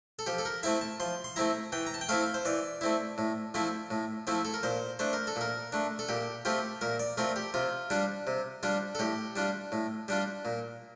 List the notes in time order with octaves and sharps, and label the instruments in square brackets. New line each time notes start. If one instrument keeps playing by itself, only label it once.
[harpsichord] A4
F3 G4
A4
A#4
A3 C4 E4 E5
A5
F3 C6
C6
A3 C4 E4 A#5
E3 G5
A#5
A5
G5
A3 C4 E4 F5
C5
E3 D5
A3 C4 E4
A2
F3 A3 C4 E4
A2
F3 A3 C4 E4
A4
A#4
A#2 C5
A3 D4 C5
A#4
A4
A#2 A#4
A3 D4
A4
A#2 G4
A3 C4 F4 G4
A#2 A#4
D5
A3 C4 F4 A#4
G4
C3 F4
G3 D4 F4
C3
G3 D4 F4
A4
A2 G4
G3 D4 F4
A2
G3 D4 F4
A#2